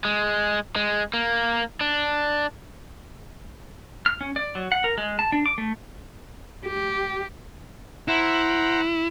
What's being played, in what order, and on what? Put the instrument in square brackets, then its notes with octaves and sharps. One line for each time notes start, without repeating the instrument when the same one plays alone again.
[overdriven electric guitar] G#3
G#3
A#3
D4
[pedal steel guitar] F6
C#4
D5
F#3
F#5
A#4
G#3
A5
D4
D6
A3
[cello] G4
[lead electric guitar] E4 [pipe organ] C5 F#5 A#5